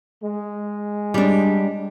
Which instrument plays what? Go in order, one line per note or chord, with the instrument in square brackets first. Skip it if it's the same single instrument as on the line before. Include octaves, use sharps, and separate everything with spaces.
[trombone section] G#3
[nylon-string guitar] G3 D4